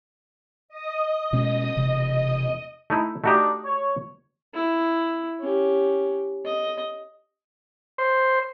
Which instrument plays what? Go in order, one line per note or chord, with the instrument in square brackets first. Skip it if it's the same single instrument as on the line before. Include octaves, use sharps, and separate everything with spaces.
[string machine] D#5 D#6
[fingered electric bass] B2 G#3 C#4
E1 C3
[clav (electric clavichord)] A3 D#4 E4
[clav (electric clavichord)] A3 F#4 G4 [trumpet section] D4 D#4
[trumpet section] C#5
[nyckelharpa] E4
C#4 G4
D#5
[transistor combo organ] C5